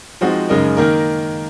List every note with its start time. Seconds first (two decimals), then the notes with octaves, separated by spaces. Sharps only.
0.21 F3 G#3 C4 D#4 F#4
0.49 F#2 C#3 G#3 D#4 A#4
0.77 D#3 A#3 D#4 A#4